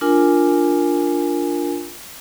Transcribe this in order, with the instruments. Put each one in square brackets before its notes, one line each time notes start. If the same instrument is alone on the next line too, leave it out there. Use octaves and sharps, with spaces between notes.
[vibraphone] D4 F4 A#4 G#5